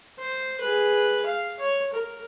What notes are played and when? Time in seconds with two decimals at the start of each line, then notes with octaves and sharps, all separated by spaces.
0.19 C5
0.61 G#4 B4
1.26 F5
1.60 C#5
1.93 A#4